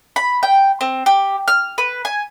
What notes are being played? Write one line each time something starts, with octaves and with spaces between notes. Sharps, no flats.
B5
G5
C4
G4
F6
B4
G#5